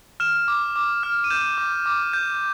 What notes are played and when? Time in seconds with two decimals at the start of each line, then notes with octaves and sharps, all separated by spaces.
0.20 F6 E7
0.48 D6
0.76 D6
1.03 F6
1.24 D#7
1.30 G6 E7
1.58 D6
1.86 D6
2.13 G6